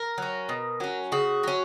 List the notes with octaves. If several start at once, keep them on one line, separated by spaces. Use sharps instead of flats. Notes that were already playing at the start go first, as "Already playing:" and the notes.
Already playing: A#4
F#3 C#4
B2
F#3 C#4
C#3 F#4
F#3 C#4